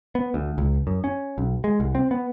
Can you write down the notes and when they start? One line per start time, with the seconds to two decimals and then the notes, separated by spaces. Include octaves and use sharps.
0.15 B3
0.34 D2
0.58 C#2
0.87 F#2
1.04 C#4
1.38 B1
1.64 G#3
1.80 C2
1.95 C4
2.11 B3